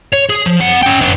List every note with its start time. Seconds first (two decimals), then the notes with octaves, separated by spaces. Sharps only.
0.13 C#5
0.30 G#4
0.46 F3
0.60 C4 F#5
0.83 C#4 G5
1.01 B3 D4